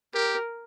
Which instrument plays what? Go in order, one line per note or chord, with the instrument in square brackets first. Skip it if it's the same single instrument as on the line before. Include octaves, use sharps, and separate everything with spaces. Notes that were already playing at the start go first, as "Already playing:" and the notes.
[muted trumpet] G4 [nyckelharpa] A#4